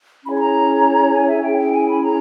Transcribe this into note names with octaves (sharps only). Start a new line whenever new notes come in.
C#4 E4 G#4 C#5 B5
B5
A#5
G#5
E5
C#4 E4 G#4 G5
G5
G#5
B5
A#5